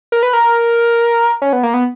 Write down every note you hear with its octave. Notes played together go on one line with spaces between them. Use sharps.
A#4
B4
A#4
C#4
B3
A#3
B3